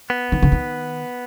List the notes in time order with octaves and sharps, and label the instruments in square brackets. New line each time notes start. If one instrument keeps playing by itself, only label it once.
[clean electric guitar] B3
[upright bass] D#3
D3
D#3